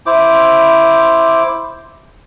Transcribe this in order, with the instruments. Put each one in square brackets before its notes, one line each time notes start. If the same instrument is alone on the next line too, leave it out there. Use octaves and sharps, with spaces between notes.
[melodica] E4 C5 D6